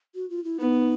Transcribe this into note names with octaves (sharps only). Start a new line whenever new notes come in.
F#4
F4
E4
B3 D#4